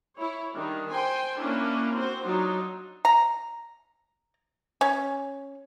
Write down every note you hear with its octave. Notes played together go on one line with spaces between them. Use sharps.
E4 C#5
D#3 G3 D4
C5 G5 G#5 C6
A#3 C#4 D4 E4
C4 F#4 C5
F#3 D4 D#4 F4
A#5
C#4